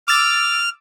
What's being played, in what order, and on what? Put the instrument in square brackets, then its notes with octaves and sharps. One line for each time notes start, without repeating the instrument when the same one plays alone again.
[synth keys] D6 E6 A6 [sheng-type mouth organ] F6